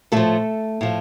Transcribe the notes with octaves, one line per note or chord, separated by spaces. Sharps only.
A2 F3 A3 A4
A2 F3